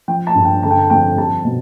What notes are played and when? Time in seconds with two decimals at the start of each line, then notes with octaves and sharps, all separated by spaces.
0.08 F3 G5
0.27 A5
0.35 G2
0.45 G5
0.63 D3 A5
0.71 G5
0.79 A5
0.90 F2 G5
1.17 G3 A5
1.45 B2